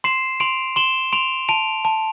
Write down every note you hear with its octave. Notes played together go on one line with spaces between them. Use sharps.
C6 C7 E7
C6 D7 F7
C6 E7 G7
C6 D7 F7
A5 D7 F7
A5